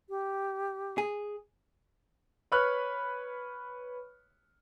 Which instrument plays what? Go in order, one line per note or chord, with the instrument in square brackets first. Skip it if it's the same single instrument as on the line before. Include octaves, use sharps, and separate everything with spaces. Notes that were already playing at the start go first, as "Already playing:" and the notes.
[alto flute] G4
[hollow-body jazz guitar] G#4
[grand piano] B4 C#5 B5 C#6 F6 F#6